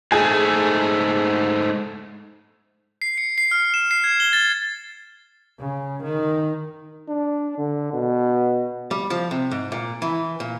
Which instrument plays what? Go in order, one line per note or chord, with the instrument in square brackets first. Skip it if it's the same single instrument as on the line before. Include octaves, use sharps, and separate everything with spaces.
[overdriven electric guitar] G#2 A3 [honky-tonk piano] G#4
[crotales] C7
C#7
C7
F6
E7
C7
G#6
G7
A6
[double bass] C#3
D#3
[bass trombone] D4
D3
B2
[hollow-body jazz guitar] G3
F3
C3
G#2
A#2
E3
A#2